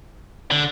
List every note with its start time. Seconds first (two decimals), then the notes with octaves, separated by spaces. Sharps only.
0.51 D3